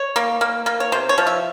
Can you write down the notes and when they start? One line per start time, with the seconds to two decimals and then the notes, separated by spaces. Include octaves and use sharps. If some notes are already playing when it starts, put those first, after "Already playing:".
Already playing: C#5
0.16 A#3
0.41 A#3
0.66 A#3
0.80 C#5
0.92 C3 C5
1.09 C#5
1.18 F3
1.27 E5